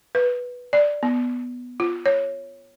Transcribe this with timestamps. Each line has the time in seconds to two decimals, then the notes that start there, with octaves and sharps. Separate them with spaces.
0.15 B4
0.73 D5
1.03 B3
1.80 F4
2.06 C#5